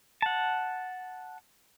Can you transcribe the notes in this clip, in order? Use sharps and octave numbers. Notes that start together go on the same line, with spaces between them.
F#5 A5